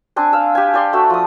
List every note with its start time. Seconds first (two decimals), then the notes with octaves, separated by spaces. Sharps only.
0.16 C4 D4 G#5
0.33 F5 E6
0.55 G4 G#5
0.74 G4 D5 C6
0.93 A3 F#4 E5
1.10 F3 D#6